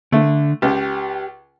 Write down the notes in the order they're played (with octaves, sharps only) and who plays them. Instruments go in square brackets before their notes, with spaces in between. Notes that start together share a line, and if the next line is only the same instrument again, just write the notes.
[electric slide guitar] D3 [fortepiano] A3
[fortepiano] C#2 [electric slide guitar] G4